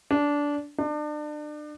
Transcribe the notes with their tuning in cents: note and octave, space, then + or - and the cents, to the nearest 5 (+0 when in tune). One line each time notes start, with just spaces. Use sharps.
D4 -15
D4 +35